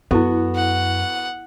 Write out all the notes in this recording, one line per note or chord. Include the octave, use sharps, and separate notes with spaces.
F#2 B3 E4 F#4 A4
F#5